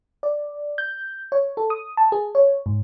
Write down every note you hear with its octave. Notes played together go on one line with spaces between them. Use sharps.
D5
G6
C#5
A4
D#6
A5
G#4
C#5
G#2